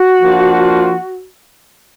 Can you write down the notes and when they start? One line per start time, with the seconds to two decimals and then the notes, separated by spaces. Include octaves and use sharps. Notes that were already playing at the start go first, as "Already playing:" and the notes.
Already playing: F#4
0.22 F3 A#3 D4 F4